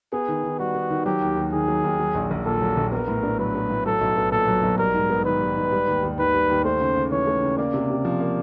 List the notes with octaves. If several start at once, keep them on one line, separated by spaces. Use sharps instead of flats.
B3 G#4
D#3
D#3
G3 F#4
B3
D#3
F#3 G4
D#2
D#2
D#3 G#4
F#3
D#2
F#3
A#1
A#1
A#2 A4
F#3
A#1
B3 A#4
A2
D4
F#3 B4
B3
A2
F#3 A4
B1
B3
A#2 A4
F#3
B1
G3 A#4
G#2
B3
D#3 B4
G3
G#2
G3
D#2
D#2
D#3 B4
G3
D#2
A3 C5
C#3
C#3
E3 C#5
A3
C#3
A#3 D5
C3
C3
F3
A#3